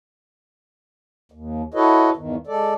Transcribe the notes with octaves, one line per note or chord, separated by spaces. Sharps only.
D#2
E4 F#4 A4 B4 C#5 D#5
E2 G2 D#3
G#3 A4 D5